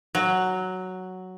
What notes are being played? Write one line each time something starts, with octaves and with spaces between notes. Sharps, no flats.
F#3